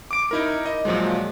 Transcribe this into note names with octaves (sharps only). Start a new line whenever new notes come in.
D6 D7
D#4 E4 A#4
D#5
A#2 F3 F#3 G#3